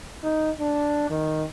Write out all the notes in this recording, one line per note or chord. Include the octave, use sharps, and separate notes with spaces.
D#4
D4
D#3